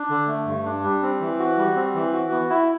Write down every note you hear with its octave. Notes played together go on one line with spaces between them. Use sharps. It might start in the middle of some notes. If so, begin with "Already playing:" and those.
Already playing: D4
D3
A3
G2
D4
G3
C4
E3
F#4
G3
C4
E3
F#4
B3
E4